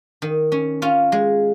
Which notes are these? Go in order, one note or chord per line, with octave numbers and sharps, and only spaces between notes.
D#3
C#4
C#4 F4
G#3